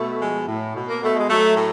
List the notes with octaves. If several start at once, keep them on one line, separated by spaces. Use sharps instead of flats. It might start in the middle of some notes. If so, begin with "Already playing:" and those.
Already playing: B2 A3
F3 G#3
A2
B2
A#3
B2 A3
G#3
F#3 A3
A2 A3